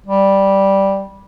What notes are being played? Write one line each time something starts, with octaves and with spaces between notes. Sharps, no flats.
G3